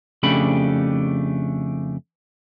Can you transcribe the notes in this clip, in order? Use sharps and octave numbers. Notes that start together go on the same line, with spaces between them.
F2 C#3 A3 D4 G4 B5